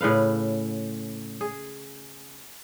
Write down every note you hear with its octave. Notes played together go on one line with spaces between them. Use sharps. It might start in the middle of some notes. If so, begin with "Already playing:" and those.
A2 C#3 B4 F5
G#4